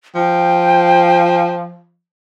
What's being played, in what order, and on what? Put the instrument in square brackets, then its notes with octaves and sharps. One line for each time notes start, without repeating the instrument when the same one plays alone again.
[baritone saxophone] F3 [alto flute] G5